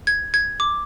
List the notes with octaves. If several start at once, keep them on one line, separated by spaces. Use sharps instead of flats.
G#6
G#6
D6